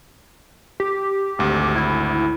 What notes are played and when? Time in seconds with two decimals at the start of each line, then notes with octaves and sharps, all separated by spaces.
0.80 G4
1.39 G#1 D2
1.76 E4